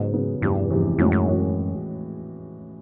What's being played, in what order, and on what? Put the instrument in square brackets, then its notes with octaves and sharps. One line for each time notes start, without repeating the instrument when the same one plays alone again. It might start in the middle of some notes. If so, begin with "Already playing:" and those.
Already playing: [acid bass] G#2 [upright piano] C#3 F#3 B3
[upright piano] C#3 F#3 B3
[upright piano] F1 E2 C3 E3 [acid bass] G2
[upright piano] F1 E2 C3 E3
[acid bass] F2 [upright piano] A2 E3 G#3 C#4 F#4
[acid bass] F#2
[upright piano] A2 E3 G#3 C#4 F#4